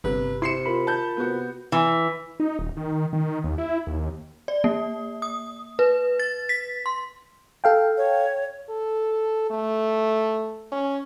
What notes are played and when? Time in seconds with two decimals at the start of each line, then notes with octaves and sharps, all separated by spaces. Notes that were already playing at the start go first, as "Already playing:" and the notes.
0.04 G1 C3 B4
0.42 C3 E4 C6 C7 C#7 E7
0.66 F4 A#4 B5
0.87 A5 G6
1.17 C3 B3 F#4
1.72 E3
2.40 D#4
2.59 D#1
2.77 D#3
2.92 D#3
3.13 D#3
3.44 D#2
3.58 E4
3.87 D#2
4.48 D5
4.64 A#3
5.22 D#6
5.79 B4
6.19 A6
6.49 B6
6.86 C6
7.64 A4 F5 G5
7.98 C#5
8.70 A4
9.50 A3
10.72 C#4